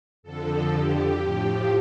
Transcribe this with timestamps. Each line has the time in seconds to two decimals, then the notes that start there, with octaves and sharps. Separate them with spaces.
0.23 F2 D3 F3 A4
0.73 G4
1.23 A2 F3 G4